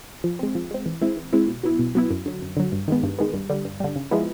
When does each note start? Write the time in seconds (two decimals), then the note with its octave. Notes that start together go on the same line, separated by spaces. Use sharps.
0.24 F3
0.39 G#3 C4
0.55 F3
0.71 G#3 C4
0.86 E3
1.02 G#3 C4 E4
1.17 E3
1.33 G#3 C4 E4
1.48 B2
1.63 F#3 B3 E4
1.79 B2
1.95 F#3 B3 E4
2.10 F#2
2.26 D3 F#3
2.42 F#2
2.57 D3 F#3
2.72 G2
2.88 D#3 G#3 B3
3.03 G2
3.18 D#3 G#3 B3
3.34 G2
3.50 D3 G3
3.65 G2
3.80 D3 G3
3.96 C#3
4.11 F3 G#3 B3 E4